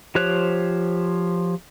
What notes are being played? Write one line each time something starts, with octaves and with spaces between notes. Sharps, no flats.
F3 G4 C5 C#5 F#6